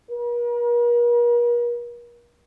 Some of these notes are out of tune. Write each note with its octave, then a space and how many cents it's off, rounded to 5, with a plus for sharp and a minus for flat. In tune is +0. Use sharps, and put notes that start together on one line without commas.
A#4 +45